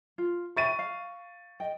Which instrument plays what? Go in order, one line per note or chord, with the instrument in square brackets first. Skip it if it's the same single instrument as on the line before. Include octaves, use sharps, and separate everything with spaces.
[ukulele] F4
[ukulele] G4 E5 B5 [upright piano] C#6 A6 D#7
[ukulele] F5
D#5 G5